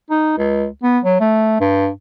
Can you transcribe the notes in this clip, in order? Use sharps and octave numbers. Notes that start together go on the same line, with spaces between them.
D#4
C#2
B3
F#3
A3
G2